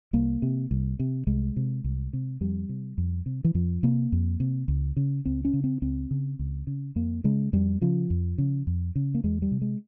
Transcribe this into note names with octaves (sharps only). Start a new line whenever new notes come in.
C2 A#3
C3
C2
C3
C2 G#3
C3
C2
C3
F2 G3
C3
F2
C3
E3
F2 F3
C3 A#3
F2
C3
C#2
C#3
C#2 C4
C#4
C#3
C4
C#2 C4
C#3
C#2
C#3
F2 A#3
C#3 G#3
F2 G3
C#3 F3
F2
C#3
F2
C#3
A#3
E2 G#3
G3
C3
G#3